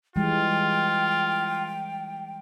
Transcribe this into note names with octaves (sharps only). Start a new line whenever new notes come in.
E3 G3 G#3 F4 G5